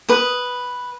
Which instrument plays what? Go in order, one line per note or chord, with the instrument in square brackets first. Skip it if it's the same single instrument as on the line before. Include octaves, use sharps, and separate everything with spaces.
[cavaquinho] B4 D#6